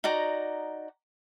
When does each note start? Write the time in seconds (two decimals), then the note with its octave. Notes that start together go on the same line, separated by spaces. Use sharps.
0.04 D#4 F#4 D5 A#5